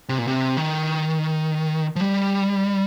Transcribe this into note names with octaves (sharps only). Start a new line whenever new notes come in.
C3
A#2
C3
D#3
F3
G3